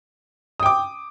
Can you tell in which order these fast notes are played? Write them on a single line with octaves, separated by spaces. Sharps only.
D#6 G5 D6